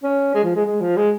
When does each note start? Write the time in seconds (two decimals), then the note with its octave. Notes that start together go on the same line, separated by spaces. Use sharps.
0.03 C#4
0.35 G#3
0.44 F3
0.55 G#3
0.66 G#3
0.81 F3
0.97 G#3